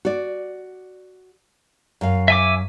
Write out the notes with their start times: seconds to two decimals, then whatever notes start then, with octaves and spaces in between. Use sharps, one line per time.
0.05 F#4 D5
2.01 F#2 F5
2.28 E5 G#5 D6